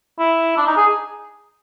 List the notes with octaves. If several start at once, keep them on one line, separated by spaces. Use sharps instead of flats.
E4
D4
D#4
G#4